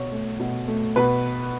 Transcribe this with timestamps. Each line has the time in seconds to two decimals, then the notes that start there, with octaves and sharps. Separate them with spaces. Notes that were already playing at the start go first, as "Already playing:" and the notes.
Already playing: B2 C#5
0.12 A3
0.39 B2
0.68 A3
0.96 B2 B4